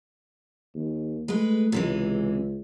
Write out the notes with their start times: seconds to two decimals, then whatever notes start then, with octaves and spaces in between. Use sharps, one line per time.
0.74 D#2
1.28 G#3 A3 B4
1.72 C#2 C3 E3 G#3